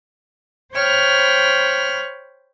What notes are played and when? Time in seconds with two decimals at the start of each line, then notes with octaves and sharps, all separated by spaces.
0.75 C5 C#5 G5 B5 F6